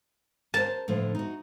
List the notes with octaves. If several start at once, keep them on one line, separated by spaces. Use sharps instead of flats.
A#4 C5 A5
A2 D3 F3
D#4 F#4